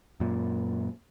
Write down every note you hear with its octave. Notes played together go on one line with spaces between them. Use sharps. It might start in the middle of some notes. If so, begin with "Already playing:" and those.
F#2 A#2